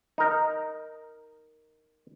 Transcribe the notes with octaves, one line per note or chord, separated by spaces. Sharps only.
D#4 A#4